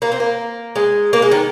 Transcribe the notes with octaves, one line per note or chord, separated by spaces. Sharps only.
A#3
C4
A#3
G#3
A#3
G#3
D#3